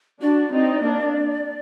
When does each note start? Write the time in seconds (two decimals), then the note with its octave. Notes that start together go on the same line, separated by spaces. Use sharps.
0.21 D4 F#4 D5
0.52 C4 D#4
0.83 A#3 D4